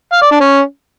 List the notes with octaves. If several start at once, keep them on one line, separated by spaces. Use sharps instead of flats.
F5
D5
D4
C#4